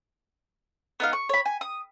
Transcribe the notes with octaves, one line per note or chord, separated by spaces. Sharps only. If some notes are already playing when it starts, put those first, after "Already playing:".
B3 D#4 F5
C#6
C#5 B5
G#5
D#6